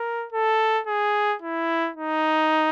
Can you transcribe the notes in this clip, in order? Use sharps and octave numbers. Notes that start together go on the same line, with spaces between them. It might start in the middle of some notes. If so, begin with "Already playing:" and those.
Already playing: A#4
A4
G#4
E4
D#4